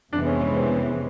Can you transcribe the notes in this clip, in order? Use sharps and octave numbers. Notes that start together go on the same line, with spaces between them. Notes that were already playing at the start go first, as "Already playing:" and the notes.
F2 C3 E3 G#3 B3 D4
C#4
C#4
C4